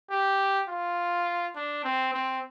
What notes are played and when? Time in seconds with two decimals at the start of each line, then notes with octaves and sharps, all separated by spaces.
0.11 G4
0.69 F4
1.56 D4
1.85 C4
2.14 C4